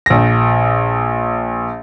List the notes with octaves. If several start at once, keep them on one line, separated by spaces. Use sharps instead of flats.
A#1 A#6